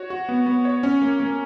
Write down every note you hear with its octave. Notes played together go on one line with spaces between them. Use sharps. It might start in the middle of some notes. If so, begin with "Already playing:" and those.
Already playing: F#4 C#5
F#4
B3
B3
C#5
C#4
A#3
A#3